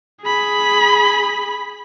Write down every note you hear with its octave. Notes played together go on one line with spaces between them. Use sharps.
G#4 B5